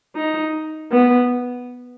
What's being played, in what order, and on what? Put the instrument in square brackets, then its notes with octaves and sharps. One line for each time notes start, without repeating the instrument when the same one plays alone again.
[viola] D#4
B3